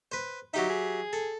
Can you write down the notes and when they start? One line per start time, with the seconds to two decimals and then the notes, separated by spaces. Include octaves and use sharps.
0.12 B4 C5
0.54 F#3 D#4 G4 E5
0.70 G#4
1.13 A4